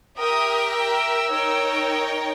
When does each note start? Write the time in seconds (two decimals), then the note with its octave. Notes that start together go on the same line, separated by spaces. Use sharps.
0.19 G4 A#4 E5 G5 D#6
0.76 E6
1.33 D#4 A#4 C#5 G5